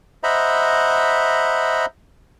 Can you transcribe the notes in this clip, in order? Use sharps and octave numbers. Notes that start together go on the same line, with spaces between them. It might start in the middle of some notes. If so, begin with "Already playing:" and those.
C5 D#5 E5 F#5 A#5 B5